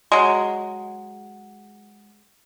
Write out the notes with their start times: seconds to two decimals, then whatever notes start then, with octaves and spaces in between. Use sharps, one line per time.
0.12 F#3 G#3